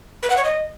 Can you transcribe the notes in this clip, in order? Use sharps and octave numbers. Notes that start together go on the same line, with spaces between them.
B4
F#5
C#5
D#5